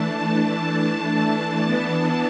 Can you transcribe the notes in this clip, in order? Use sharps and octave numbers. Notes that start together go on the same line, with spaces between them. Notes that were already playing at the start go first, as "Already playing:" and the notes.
Already playing: E3 A3 D4 A5
A5
A5
E3 B3 D4